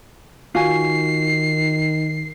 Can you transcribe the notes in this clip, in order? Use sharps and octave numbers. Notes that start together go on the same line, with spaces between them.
D#3 F4 F#4 G#5 C7